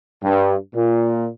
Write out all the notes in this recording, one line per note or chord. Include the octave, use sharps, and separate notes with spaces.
G2
A#2